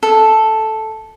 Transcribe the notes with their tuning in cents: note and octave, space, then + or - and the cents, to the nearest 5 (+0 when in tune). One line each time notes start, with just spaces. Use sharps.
A4 -5